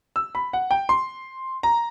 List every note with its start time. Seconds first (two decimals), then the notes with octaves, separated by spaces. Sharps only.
0.16 E6
0.35 B5
0.53 F#5
0.71 G5
0.89 C6
1.63 A#5